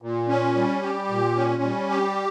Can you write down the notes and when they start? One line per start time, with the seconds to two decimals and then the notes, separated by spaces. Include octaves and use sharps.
0.02 A#2
0.28 C#4
0.56 G3
0.83 G4
1.09 A#2
1.36 C#4
1.63 G3
1.89 G4